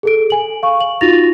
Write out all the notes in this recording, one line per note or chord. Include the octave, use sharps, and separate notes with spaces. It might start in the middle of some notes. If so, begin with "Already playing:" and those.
G#4 A4 D7
G#5 F#7
F5 C#6
F#7
D#4 F4 F#4 A6 A#6 F7